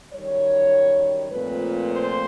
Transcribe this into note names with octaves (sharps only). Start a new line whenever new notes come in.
F#2 D#3 G3 C#5
A#2 F3 A3 C4 B4
C5